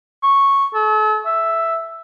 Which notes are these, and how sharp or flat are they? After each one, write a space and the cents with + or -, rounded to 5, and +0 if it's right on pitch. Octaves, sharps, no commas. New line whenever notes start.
C#6 -5
A4 -40
E5 +5